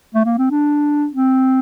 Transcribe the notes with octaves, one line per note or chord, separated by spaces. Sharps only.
A3
A#3
C4
D4
C4